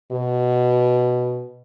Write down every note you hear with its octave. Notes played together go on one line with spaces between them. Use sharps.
B2